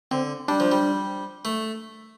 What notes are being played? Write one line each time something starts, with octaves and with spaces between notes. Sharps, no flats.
D3 C4
G3 D4
F3
G3
A3